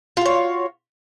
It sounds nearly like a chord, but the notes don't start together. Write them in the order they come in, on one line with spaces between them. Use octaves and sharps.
F4 F#4 C#5